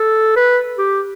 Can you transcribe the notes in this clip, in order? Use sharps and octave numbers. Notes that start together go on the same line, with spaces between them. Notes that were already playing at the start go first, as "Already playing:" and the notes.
Already playing: A4
B4
G4